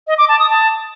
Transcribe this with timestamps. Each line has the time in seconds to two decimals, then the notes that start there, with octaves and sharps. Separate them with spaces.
0.07 D#5
0.18 D6
0.29 A5
0.39 D#6
0.50 A5